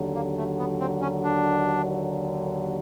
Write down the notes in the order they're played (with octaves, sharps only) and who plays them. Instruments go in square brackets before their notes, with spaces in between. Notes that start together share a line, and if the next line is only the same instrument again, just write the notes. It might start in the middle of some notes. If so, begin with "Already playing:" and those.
Already playing: [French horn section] D#2 D3 F#3
[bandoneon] A#3
A3
B3
C4
C#4
D4